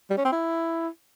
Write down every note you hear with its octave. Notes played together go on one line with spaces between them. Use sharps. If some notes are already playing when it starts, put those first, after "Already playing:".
G3
C#4
C4
E4